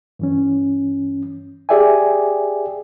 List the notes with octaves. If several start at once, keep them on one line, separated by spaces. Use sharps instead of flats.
G2 E3 C#4
G4 G#4 D5 E5 G5 G#5